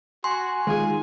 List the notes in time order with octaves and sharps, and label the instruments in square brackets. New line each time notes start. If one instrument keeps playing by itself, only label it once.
[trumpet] F#4 [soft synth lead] G#5 [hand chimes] C6
[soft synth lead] D#3 [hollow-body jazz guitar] G#3 F4 G#4 [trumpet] G#5